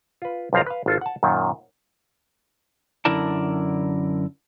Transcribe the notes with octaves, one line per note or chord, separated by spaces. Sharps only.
F4 B4
B1 F2 F3 F5 A#5
B4 F5
G#1 F4 A4
F#5 A5
F#2 A#2 D#3
F#2 D3 E4 A#4 D5 A5